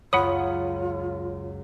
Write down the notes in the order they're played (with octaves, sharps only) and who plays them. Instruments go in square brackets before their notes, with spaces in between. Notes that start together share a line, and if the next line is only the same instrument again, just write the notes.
[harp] C#2 F#2 [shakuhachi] F4 [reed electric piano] C#5 [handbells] F#5 B5 D#6